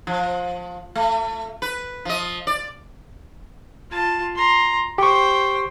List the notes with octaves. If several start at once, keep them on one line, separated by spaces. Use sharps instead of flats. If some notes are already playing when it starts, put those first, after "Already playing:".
F3
A3
B4
F3 D#5
D5
F4 A5
A#5 C6
G4 C5 G5 C#6